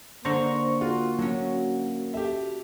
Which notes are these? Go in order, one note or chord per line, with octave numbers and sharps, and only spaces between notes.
D3 A#3 D4 C5 A#5 C#6
F4 F#4
F#3 C#4 D4
G4 A4 E5